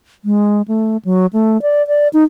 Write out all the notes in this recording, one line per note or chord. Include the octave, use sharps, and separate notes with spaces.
G#3
A3
F#3
A3
D5
D5
D#4